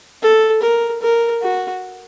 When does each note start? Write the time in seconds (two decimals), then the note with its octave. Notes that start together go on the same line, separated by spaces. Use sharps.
0.22 A4
0.62 A#4
1.02 A#4
1.42 F#4